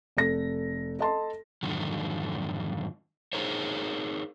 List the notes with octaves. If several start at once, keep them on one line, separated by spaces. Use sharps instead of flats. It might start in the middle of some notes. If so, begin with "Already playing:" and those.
F1 A4 A#6
A4 D#5 A5 C6
F2 G#2 D3 D#3 F#3
D#4 G#4 A#4 C5 C#5